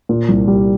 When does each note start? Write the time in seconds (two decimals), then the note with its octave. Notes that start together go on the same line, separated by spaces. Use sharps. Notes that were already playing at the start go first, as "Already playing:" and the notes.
0.09 A#2
0.29 C2
0.48 G3